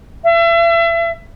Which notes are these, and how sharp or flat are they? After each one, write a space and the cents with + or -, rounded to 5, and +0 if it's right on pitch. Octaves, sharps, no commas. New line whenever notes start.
E5 +35